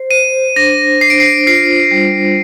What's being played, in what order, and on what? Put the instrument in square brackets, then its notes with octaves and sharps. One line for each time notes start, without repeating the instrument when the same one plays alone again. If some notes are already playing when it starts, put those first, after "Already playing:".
Already playing: [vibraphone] C5
[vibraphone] C5 [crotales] D#7
[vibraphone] D4 [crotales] A#6
[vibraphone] D4 [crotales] C7
[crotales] D7
C7
[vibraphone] F4 [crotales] C7
[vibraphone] G3